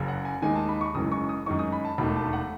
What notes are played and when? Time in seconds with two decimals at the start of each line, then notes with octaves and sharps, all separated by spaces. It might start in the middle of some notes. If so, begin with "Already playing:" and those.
Already playing: F#1 F#2 C#3
0.08 F#5
0.25 G#5
0.42 D#2 D#3 G#3 D#4 G#5
0.56 A5
0.68 B5
0.81 C#6
0.94 F#1 F#2 E3 G#3 D#6
1.12 C#6
1.29 D#6
1.46 F#2 D#3 G#3 D#4 C#6
1.59 D#6
1.72 B5
1.85 A5
1.98 E1 D#2 D#3 A3 B5
2.16 A5
2.33 F#5